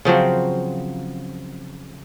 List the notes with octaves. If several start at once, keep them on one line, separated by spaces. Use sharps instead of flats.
C#3 F3 F#3 C4